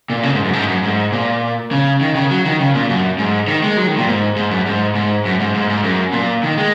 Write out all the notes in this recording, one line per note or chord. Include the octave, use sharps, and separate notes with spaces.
A#2
C#3
G#2
F#2
G#2
F#2
G#2
A#2
C#3
D#3
C#3
F#3
D#3
C#3
A#2
F#2
G#2
D#3
G#3
F#3
D#3
A#2
G#2
G#2
F#2
G#2
G#2
F#2
G#2
G#2
G#2
F#2
A#2
D#3
G#3